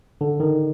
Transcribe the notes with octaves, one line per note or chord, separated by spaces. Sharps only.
D3
D#3